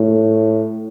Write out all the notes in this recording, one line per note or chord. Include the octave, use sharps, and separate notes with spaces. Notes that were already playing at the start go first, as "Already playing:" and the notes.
Already playing: A2